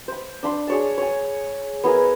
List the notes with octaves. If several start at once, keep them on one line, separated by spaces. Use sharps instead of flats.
C5 B5
D4 B5 C6
G#4 C#5 A5
C#5 G#5
B3 E4 G#4 A#4